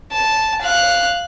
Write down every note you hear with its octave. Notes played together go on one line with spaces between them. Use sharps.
A5
F5 F#6